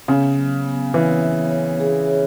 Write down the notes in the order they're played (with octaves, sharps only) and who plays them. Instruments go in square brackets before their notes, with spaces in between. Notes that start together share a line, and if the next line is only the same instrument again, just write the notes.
[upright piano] C#3 [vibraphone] B3
[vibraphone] F#3
B3
[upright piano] E3 [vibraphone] C#5
[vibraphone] E5
C#5
G#4
C#5